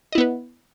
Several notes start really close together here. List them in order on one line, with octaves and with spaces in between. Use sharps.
D#5 E4 B3 B4